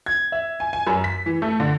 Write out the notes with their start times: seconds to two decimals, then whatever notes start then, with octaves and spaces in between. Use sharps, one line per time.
0.06 G#6
0.32 E5
0.60 G#5
0.73 G#5
0.87 F#2
1.04 B6
1.26 E3
1.42 A3
1.60 D3